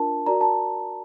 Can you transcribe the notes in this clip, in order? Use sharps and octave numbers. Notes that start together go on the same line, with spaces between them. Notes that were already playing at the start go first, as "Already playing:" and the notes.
Already playing: D4 F4 A#4 A5
F#4 A#4 D5 A#5
A5